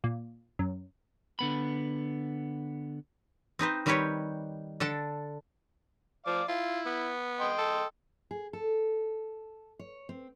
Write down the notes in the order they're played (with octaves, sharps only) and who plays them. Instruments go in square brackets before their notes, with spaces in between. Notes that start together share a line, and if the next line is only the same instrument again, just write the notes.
[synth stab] A#2
F#2
[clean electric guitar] D3 B3 B5
[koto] C4 D#4 B4 C5
D#3 G3 C4 G4 B4 C#5
D3 D4 A4 A5
[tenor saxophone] F3 [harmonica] D5 F5 D6
[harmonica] E4 [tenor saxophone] F4
[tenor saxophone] B3
[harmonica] D#5 G5 C6
[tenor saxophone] A4
[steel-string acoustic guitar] G#4
A4
C#5
C4